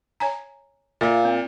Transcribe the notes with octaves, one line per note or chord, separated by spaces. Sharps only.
C#5 G#5 A#5
A#2 E5 F5
C4